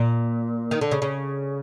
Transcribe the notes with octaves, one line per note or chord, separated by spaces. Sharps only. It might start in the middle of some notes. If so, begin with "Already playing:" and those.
Already playing: A#2
D#3
D3
C#3
C#3